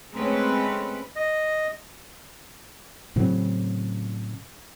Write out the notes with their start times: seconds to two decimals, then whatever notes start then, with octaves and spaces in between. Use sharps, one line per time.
0.12 G#3 A3 C4 C#4 B4
1.16 D#5
3.16 A2 C#3 F#3 C4